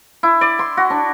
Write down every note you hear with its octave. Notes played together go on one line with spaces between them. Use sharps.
E4
D5
C6
F#4
D4